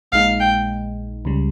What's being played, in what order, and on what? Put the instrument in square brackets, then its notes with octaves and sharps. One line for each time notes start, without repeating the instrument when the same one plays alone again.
[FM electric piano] A#1 A#2 G#3 D#4 [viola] F5
[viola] G5
[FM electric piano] C#2 C#3 G3